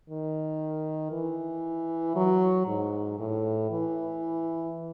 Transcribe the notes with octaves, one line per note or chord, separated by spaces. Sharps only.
D#3
E3
F#3
G#2
A2
E3